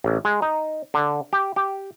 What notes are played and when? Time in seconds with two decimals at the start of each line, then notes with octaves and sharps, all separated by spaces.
0.04 A1
0.25 G#3
0.42 D#4
0.94 D3
1.33 G4
1.56 G4